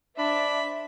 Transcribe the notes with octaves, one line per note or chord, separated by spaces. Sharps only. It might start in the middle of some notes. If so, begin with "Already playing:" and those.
D4 C5 D5 E5 B5